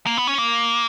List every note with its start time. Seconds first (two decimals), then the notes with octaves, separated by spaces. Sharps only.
0.07 A#3
0.17 B3
0.27 C#4
0.38 A#3